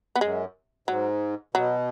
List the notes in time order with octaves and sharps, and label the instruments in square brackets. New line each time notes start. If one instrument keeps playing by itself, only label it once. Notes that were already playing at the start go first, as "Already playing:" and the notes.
[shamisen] B3
[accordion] F#2 [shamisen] G#3
[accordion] G#2 [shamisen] F#3
[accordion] B2 [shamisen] F#3